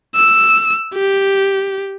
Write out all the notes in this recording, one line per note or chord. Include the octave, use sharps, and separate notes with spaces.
E6
G4